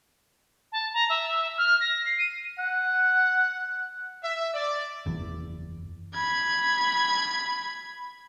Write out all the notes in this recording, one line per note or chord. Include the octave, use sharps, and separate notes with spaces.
A5
A#5
E5
F6
A#6
C7
D#7
F#5
E5
D5
F#1 E2
B5 G#6